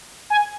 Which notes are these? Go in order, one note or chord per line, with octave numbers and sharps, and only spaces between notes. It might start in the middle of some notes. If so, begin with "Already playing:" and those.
G#5